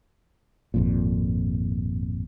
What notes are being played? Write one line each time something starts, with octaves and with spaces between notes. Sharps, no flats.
G#1 F2 A#2